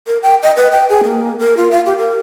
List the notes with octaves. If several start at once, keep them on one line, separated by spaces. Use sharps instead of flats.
A#4
G5
D#5
B4
G5
G#4
A#3
A#4
F4
F5
G4
A#4